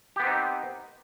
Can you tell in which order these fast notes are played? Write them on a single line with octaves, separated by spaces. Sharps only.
G4 B3 C4 D#4